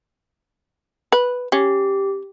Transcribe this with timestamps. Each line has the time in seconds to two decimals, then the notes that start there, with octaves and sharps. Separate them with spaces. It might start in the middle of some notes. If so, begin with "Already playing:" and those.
1.12 B4
1.52 C#4 G4